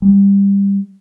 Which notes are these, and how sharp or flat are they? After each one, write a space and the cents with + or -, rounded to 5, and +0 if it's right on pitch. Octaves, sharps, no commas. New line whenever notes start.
G3 +20